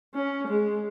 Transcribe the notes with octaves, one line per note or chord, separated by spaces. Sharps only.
C#4
G#3